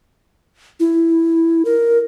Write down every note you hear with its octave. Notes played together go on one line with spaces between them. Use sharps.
E4
A#4